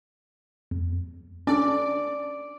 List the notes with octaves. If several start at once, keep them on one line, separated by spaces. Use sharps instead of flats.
F2
C#4 D4 A4 D5